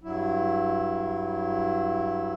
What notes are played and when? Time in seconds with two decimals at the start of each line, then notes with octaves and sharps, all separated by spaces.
0.03 G2 F#3 E4